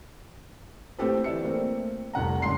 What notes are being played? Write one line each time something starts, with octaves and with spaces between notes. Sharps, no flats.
A3 C4 E4 G4 A4 B4
E3 D5 E5 C#7
A3 A#3 C4
F1 C2 F#5 A#5
F#1 G#3 C6 C7